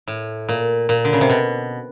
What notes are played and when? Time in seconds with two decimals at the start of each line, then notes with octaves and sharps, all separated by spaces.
0.08 A2
0.49 A#2
0.89 A#2
1.05 D3
1.13 C#3
1.21 C3
1.30 B2